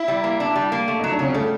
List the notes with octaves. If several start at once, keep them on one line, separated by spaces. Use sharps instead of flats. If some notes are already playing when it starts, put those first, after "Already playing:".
Already playing: E4
G3
A#3
D4
G3
A#3
A3
D#4
F#3
D4
C#3 C#4
G3 A3